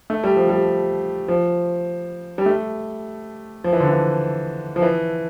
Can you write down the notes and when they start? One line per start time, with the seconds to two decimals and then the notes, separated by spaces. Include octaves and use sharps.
0.10 A3
0.24 G3
0.36 F3
0.49 G3
1.28 F3
2.38 G3
2.46 A3
3.64 F3
3.73 E3
3.80 D3
3.89 E3
4.76 F3
4.82 E3